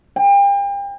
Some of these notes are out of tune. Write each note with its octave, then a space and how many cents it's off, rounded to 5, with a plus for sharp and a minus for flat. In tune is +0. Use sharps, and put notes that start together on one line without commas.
G5 +35